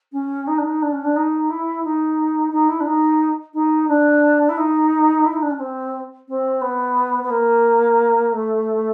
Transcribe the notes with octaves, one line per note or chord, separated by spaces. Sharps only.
C#4
D#4
D4
D#4
D4
C#4
D4
D#4
E4
D#4
D#4
E4
D4
D#4
D#4
D4
E4
D#4
E4
D#4
D4
C#4
C4
C4
B3
B3
A#3
A3